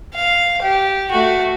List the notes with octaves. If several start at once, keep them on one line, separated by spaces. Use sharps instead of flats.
F5
G4
A3 F#4